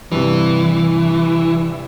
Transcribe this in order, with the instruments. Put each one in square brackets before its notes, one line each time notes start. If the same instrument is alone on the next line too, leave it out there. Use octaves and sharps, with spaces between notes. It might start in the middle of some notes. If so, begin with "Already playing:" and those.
[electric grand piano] G2 C3 [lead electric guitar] E3